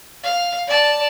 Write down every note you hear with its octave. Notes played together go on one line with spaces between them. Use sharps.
F5
D5 A5